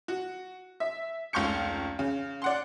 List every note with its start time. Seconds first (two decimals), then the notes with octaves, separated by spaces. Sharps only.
0.08 F#4
0.80 E5
1.33 F1 C#2 F5 C#6 G6 C#7
1.99 C#3
2.42 D5 F#5 C6